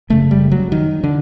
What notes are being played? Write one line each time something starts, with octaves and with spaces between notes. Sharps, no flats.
F#1 F#2 C#3 A3
G3
F#3
D#3
D3